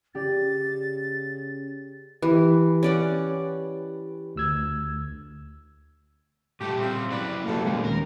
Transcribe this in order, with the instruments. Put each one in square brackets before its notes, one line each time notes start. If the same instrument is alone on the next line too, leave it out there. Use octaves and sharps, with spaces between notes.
[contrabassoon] C#3 [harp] G4 D5 [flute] A6
[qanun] E3 [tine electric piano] G4 B4
[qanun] C#4 D5 F#5
[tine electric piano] D2 E6 G#6
[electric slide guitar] A#2 G3 E5 [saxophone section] A3 G4
[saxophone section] C#3 C4
[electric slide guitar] F#3 C#4 E4 [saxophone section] B4 D5
[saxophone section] D#2 B2 [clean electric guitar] A#3 A4
[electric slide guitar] A#2 G3 [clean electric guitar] G#3 A#3 C#4
[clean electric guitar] D#2 [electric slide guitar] A#4